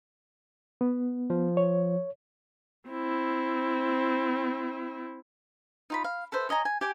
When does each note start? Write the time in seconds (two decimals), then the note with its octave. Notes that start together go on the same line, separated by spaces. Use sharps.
0.81 B3
1.30 F3
1.57 C#5
2.90 C4 E4
5.90 D#4 F4 B5
6.04 F5
6.32 A4 B4 C5 E5
6.49 C#5 D#5 G#5 A#5
6.65 G#5
6.81 G4 G#5 D6